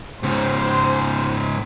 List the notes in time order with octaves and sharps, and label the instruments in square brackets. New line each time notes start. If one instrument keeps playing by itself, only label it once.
[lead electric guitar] G#2 C#3 [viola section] C5